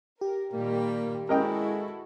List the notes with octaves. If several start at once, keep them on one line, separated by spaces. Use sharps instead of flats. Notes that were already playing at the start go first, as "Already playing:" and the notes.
G4 A#4
A#2 D#3 G3 A#3
G#3 E4 F#4 A4 A#4 D#5 G5